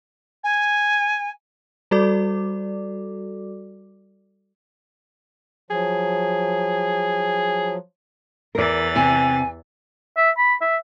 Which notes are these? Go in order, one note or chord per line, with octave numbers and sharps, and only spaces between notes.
G#5
G3 F#4 A4 D5 D6
F3 F#3 G#4
E2 E3 A#4 D5 A6
C3 G#5
E5
B5
E5